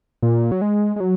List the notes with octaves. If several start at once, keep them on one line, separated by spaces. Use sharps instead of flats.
A#2
F#3
G#3
G#3
F#3